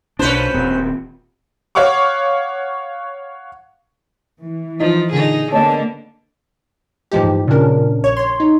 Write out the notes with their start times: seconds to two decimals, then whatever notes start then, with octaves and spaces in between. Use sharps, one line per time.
0.19 B1 C#4 D4 B4 C5
0.54 D#1 C4
1.75 C#5 F5 F#5 C#6 D6
4.42 E3
4.80 F3 D#4 F4
5.12 A#2 D3 D#4 G#4
5.52 D3 A#3 B3 C#5 D#5 A5
7.12 A2 E3 F3 G#3 D#4 G4
7.24 G2
7.48 A#2 C#3 C#4 D4 A#4
8.02 A#1 C#5 C#6
8.17 C#5 C6
8.40 D#4